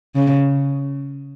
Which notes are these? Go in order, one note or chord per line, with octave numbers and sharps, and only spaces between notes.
C#3